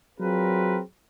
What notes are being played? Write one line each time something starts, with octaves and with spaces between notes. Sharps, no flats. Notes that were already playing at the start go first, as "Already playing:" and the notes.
F#3 C4 F4 G#4 A#4 B4